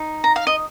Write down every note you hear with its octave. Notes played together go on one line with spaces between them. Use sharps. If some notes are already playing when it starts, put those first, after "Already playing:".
Already playing: D#4
A#5
F5
D#5